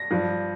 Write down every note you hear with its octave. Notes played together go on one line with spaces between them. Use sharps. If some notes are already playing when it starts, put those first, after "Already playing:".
Already playing: A#6
G2 F3